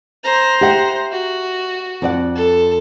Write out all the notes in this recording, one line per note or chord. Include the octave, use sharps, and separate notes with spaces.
C5 A#5
G4 E5 F#5
F#4
F2 D5 F#5
A4